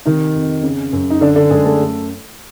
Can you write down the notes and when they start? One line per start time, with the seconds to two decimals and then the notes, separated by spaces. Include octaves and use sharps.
0.05 C3 D#3 D#4
0.35 F2
0.63 C#3
0.93 F#2
1.10 D#4
1.21 D3 D4
1.36 D3 D4
1.51 F#2 G#3 G#4
1.65 A3 A4